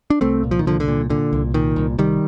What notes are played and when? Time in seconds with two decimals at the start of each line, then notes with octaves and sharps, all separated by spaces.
0.10 D4
0.21 C2 A3 C4
0.44 A#2
0.51 F3
0.59 D#3
0.66 C2 D3 F3
0.80 D3
0.88 A#2
1.10 A#2 D3
1.33 C2
1.54 A#2 D#3
1.76 C2
1.98 C2 D#3 G3